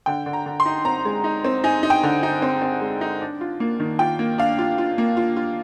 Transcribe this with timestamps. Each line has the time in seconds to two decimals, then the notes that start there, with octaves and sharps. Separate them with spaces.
0.06 D3 G5
0.26 D3
0.33 A#5
0.46 D3
0.60 C6
0.66 D#4
0.85 C4 A#5
1.05 G#3
1.24 D#4
1.44 C4
1.64 D#4 G#5
1.83 D#4
1.90 G5
2.03 D3
2.23 D#4
2.42 C4
2.62 C4
2.81 G#3
3.01 D#4
3.21 D4
3.41 F4
3.60 A#3
3.80 D#3
3.99 F4 G5
4.19 A#3
4.38 D4 F5
4.59 F4
4.78 F4
4.98 A#3
5.17 F4
5.36 F4